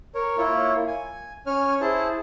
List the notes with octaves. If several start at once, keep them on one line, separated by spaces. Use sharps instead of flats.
A#4 C#5
A#3 E4 F4 C#5
G#5
C#4 C#5 G#5 F6
E4 G#4 C5 A5